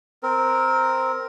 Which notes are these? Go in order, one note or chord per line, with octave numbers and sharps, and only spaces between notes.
C4 A#4